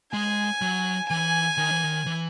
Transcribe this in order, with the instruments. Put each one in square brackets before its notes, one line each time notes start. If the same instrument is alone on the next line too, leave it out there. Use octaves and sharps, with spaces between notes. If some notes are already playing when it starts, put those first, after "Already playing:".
[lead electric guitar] G#3 [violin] G#5
[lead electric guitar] F#3
[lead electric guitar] E3 [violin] G#5
[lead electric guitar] D#3
E3
D#3
E3